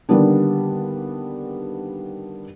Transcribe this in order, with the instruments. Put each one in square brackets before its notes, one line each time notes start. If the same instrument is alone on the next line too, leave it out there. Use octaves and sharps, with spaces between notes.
[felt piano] D3 D#3 G3 A#3 B3 D4